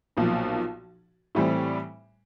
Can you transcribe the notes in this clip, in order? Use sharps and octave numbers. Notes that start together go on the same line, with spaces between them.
B1 A#2 F3
A2 E3 G3 C4